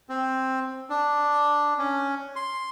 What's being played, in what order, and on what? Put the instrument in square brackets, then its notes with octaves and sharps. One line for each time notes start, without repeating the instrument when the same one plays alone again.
[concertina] C4
D4
C#4
C6